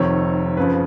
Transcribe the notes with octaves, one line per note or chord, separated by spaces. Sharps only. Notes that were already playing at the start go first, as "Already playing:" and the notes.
Already playing: F1 F2 C3 D#3 C#5
F#1 F2 C#3 F3 B4